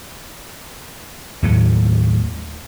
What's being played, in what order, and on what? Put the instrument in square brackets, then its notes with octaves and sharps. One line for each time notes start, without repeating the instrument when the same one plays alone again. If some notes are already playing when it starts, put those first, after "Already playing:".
[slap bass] D#2 A2 F#3 A3